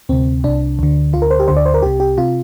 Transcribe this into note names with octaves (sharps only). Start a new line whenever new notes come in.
D2 C3 C4
C2 C3 D4
D2 D3
D2 D3 F4
A#4
C5
G4
D2 D3 C5
D5
C5
A#4
C2 C3 G4
G4
C3 F4